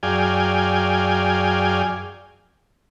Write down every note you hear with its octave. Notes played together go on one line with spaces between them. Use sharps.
F#2 G#4 D5 F5 G5 G#5